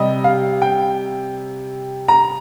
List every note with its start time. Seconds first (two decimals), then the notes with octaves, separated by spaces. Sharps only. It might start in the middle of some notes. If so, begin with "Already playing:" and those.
Already playing: C3 G3 D#5
0.24 F5
0.62 G5
2.08 A#5